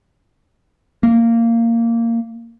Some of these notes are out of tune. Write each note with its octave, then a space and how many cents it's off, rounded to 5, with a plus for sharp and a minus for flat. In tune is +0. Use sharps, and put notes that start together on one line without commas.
A#3 -15